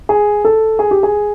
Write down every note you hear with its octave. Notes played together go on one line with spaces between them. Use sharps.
G#4
A4
G#4
G4
G#4